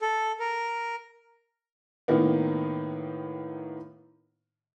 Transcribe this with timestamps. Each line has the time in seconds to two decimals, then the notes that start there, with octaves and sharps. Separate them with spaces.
0.01 A4
0.40 A#4
2.08 A2 D#3 A#3 B3